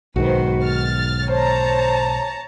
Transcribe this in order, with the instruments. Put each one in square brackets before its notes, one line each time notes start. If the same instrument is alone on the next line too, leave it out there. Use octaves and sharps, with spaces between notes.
[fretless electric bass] B1 G#2 D#3 [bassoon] F#4 [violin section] B4 C5
[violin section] F6 A6
[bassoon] C5 [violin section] C#5 A5 A#5